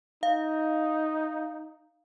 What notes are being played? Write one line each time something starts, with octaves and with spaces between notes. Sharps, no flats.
D#4 F5